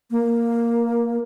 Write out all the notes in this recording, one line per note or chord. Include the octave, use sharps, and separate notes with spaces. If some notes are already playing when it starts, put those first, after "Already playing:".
A#3